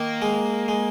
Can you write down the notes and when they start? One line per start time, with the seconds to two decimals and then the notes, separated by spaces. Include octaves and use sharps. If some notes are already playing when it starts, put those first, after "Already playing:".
Already playing: D#3 A#3
0.22 G#3
0.68 G#3